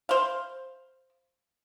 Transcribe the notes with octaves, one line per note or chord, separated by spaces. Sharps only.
C5 F5